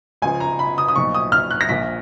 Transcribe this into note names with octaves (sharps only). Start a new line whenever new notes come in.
C#2 C#3 F3 G#5
A#5
B5
D#6
D#6
B1 A#2 F3 C#6
D#6
F6
F#6
A#6
A#1 A#2 F3 B6